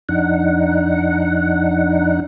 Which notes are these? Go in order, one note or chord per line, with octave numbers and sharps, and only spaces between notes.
F2 D4 D#4 F#5